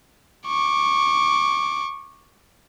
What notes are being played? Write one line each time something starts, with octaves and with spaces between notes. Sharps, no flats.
C#6 D6